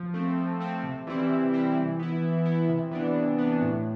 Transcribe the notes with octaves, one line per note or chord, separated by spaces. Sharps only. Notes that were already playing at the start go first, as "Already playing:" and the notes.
Already playing: F3
A3 C4
F3
A3 C4
C3
E3 G3 C4 E4
C3
E3 G3 C4 E4
E3
B3 E4
E3
B3 E4
C3
E3 B3 D4
C3
E3 B3 D4
A2